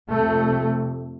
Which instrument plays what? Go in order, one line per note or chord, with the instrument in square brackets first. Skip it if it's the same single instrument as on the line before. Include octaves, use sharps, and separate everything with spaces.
[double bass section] F2 C3 A3